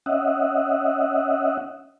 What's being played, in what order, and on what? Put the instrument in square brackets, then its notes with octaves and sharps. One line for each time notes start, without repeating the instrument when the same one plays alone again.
[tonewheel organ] C#4 D#5 E5 F#5